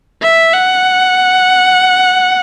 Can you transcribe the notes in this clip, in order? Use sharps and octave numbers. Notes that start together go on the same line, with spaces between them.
E5
F#5